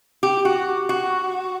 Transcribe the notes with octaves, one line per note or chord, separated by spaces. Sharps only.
G4
F#4
F#4